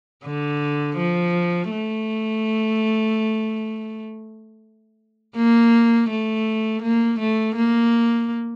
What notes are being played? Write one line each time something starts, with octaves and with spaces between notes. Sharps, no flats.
D3
F3
A3
A#3
A3
A#3
A3
A#3